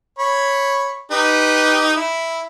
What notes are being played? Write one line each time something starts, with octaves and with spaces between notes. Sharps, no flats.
C#5 B5
D#4 G4 B4
E4